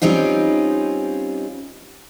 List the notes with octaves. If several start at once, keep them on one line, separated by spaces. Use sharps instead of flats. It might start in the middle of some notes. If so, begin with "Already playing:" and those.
G3 C4 C#4 D#4 F4